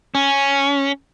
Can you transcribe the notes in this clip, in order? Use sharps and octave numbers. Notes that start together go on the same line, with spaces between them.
C#4